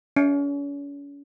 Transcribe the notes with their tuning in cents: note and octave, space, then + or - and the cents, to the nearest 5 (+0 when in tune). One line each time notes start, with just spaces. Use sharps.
C#4 +40